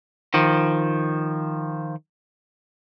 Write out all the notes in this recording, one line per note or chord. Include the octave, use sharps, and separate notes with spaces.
D#3 F3